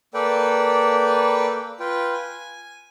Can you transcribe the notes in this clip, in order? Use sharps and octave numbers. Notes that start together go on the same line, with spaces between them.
A#3 A4 B4 D5 G5
F4 B4 G5
G#5